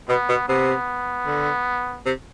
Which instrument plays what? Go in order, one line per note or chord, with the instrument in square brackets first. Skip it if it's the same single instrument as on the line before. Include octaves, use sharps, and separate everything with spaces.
[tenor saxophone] B2 [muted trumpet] B3
[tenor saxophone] B2
[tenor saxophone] C3 [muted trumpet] B3
[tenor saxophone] D3
C3